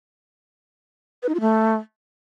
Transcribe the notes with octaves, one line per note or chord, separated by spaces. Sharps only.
B4
D#4
F4
A3